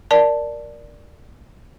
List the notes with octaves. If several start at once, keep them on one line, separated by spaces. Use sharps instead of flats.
A#4 D5 A5